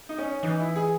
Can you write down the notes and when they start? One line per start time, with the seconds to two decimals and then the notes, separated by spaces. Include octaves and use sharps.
0.09 D#4
0.18 C#4
0.43 E3 D#4
0.60 E4
0.76 G#4